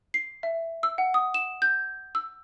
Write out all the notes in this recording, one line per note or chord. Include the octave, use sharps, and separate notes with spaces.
C7
E5
E6
F#5
D#6
E7
G6
E6